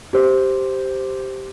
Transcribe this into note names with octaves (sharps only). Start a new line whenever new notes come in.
G4 C5